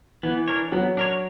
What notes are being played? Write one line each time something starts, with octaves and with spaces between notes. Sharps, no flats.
E3 B3
D4 A#4 C#5
F#3 B3
D4 A#4 C#5